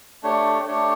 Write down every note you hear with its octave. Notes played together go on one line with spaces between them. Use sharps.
A3 D4 G4 C#5
A3 D4 G4 C#5